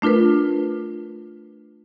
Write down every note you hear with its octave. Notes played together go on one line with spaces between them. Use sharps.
A3 D4 F4 A#4 B4